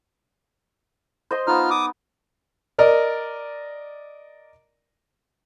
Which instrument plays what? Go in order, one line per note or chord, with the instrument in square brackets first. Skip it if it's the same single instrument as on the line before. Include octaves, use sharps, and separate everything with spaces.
[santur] C5 D#5 C6
[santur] B3 D#4 [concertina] F4 F6
[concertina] D6 D#6
[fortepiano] A#4 D5 D#5